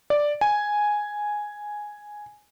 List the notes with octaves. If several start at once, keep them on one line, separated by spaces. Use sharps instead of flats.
D5
G#5